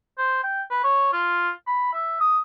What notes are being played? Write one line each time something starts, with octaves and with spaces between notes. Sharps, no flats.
C5
G5
B4
C#5
F4
B5
E5
D#6